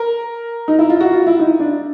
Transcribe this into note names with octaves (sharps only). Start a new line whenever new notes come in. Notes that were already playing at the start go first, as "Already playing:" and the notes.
Already playing: A#4
D#4
E4
F4
F#4
F4
E4
D#4
D4